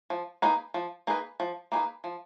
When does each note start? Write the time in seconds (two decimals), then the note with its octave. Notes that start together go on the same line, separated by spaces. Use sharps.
0.10 F3
0.42 A#3 D#4 G#4 B4
0.74 F3
1.07 A#3 D#4 G#4 B4
1.40 F3
1.72 A#3 D#4 G#4 B4
2.04 F3